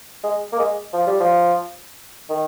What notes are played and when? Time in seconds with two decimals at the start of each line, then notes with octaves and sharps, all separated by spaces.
0.24 G#3
0.53 A#3
0.59 G#3
0.93 F3
1.07 G3
1.20 F3
2.30 D#3